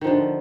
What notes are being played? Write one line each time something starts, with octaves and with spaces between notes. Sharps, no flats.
D3 D#3 F3